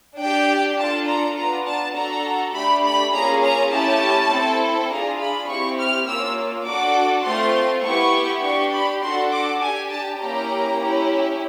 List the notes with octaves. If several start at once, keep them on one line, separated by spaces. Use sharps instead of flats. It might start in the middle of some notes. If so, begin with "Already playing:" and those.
D4 G4 G5
D4 F4 A4 A5
A#5
B3 D4 F4 A#5
A5
D4 F#4 A4 A#5
A3 D4 G4 B5
B5
A#3 C#4 F4 G#4 A#5
A#5
A3 C#4 E4 G4 A5
C4 E4 A4
D4 F4 G#4 A#5
B5
C4 E4 G4 C#6
F6
A#3 C#4 F4 E6
D4 F#4 A4 D6
A3 C4 F4 C6
B3 E4 G4 C#6
D4 G4 C#6
B5
D4 F#4 A4 C6
D6
D4 G4 G#5
A5
A#3 C#4 E4 G4 A#5
C#4 E4 G4